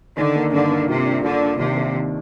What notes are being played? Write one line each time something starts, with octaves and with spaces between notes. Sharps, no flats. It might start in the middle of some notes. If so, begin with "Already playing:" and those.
D3 D#3
A#3
G2 D3
A#3
C3 F4
D4
D3 F4
D4
D#2 C3
D#2
D#3